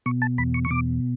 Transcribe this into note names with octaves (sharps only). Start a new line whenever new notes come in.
B2 C#6
A5
E2 B5
C#6
C#6
B2 D6